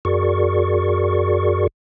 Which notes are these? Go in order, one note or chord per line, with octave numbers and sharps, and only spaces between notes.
F#2 F#4 G#4 A#4 D5 C#6